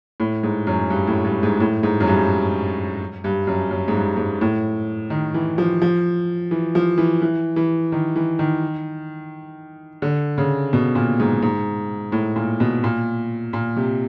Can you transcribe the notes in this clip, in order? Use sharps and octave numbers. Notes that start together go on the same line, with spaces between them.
A2
G#2
F#2
G2
A2
G2
G#2
A2
G#2
F#2
G2
G2
F#2
F#2
G#2
G2
G#2
A2
D#3
E3
F3
F3
E3
F3
E3
E3
E3
D#3
E3
D#3
D3
C#3
B2
A#2
G#2
G#2
A2
A#2
B2
A#2
A#2
C3